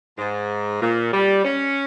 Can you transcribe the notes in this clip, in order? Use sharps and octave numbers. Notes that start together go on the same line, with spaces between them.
G#2
A#2
G3
C#4